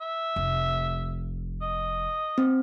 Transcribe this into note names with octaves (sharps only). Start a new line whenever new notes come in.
E5
F1
D#5
C4